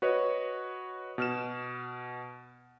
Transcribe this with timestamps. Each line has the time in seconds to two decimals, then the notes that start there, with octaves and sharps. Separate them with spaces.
0.02 F#4 B4 C#5 D#5
1.18 B2 F6 E7